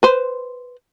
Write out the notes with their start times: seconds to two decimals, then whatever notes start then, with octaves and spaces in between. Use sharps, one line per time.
0.03 B4 C5